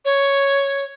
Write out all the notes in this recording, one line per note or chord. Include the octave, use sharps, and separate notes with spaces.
C#5